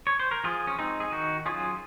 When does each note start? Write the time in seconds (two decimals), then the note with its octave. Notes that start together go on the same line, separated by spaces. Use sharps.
0.07 C#5
0.20 C5
0.31 A#4
0.44 F3 F4 G#4
0.67 C#4
0.78 G#3 C4 D#4
1.00 G#4
1.12 D#3 D#4 F#4
1.46 F#3 C#4 F4 G#4